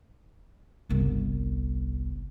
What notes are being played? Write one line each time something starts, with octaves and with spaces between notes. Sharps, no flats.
G1 C2